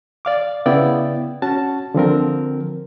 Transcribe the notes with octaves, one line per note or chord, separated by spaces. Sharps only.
D5 F5 D6
C#3 B3 E4 D5 G5
C#4 F#4 A5
D3 F3 C4 A#4